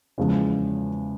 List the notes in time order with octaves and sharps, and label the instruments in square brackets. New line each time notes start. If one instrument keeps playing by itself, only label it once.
[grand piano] E2 C#3 F3 G#3